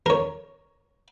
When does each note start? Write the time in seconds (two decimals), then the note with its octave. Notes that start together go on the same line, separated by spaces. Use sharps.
0.06 A#4 C#5